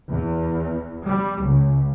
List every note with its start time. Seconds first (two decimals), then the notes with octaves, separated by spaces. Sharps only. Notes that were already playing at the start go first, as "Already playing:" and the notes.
0.11 E2
1.06 G3
1.46 C#2